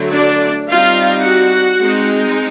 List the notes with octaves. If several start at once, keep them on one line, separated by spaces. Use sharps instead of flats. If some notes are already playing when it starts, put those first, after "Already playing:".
Already playing: D3 F#3 A3
D4 D5
G3 C4 D#4 F4 F5
F#4 F#5
G#3 C4 D#4